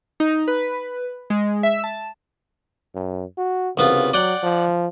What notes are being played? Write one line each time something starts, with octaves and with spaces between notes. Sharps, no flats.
D#4
B4
G#3
E5
A5
F#2
F#4
C2 C#3 B3 F4
F#3 D5 F#5 G5
F3